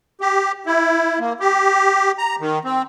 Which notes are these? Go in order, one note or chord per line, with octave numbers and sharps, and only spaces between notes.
G4
E4
A#3
G4
A#5
D#3
C4